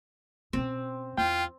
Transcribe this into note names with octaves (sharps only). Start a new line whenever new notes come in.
B2 C4 C#4
E2 F4 G5